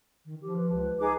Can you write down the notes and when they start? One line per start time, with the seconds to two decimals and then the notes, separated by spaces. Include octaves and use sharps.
0.25 D#3
0.41 F3 G4
0.56 B4
0.72 C#2
1.00 D#4 G#4 D6